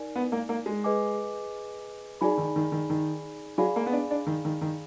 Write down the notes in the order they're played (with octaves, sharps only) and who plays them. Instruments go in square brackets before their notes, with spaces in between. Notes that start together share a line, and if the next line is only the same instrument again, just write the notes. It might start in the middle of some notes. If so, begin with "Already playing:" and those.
Already playing: [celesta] D#4 A#4 D5 G#5
[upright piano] B3
A#3
A#3
G#3
[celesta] G#4 B4 D#5 G#5 D6
[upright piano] F#3 [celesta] D#4 G#4 D5 G#5 B5
[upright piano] D#3
D#3
D#3
D#3
[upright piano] F#3 [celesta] G#4 D5 F5 G#5 B5
[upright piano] A#3
B3
D4
D4
D#3
D#3
D#3